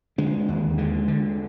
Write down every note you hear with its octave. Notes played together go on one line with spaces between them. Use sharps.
D3 G#3
D#2
D3 G#3
D3